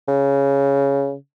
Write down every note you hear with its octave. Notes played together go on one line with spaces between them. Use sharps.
C#3